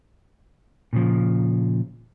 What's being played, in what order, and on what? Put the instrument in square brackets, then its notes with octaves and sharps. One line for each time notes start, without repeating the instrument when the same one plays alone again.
[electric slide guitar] A#2 C#3 F3